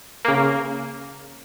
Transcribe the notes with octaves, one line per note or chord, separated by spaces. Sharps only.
C#3 A#3